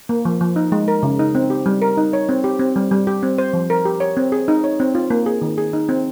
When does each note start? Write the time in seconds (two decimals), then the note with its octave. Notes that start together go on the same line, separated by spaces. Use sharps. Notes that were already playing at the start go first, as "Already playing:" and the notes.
0.09 A#3
0.25 F3
0.41 F3
0.56 D#4
0.72 G#3
0.88 A#4
1.03 C#3
1.19 D#4
1.35 C4
1.50 G4
1.66 G3
1.82 A#4
1.97 D#4
2.13 C#5
2.29 C4
2.44 G4
2.59 C4
2.76 G3
2.91 G3
3.07 G4
3.23 C4
3.38 C5
3.53 F3
3.70 A#4
3.85 G4
4.00 C#5
4.17 C4
4.32 G#4
4.48 D#4
4.64 C#5
4.80 C4
4.95 F4
5.10 A#3
5.26 G#4
5.42 D#3
5.58 G#4
5.73 D#4
5.89 C4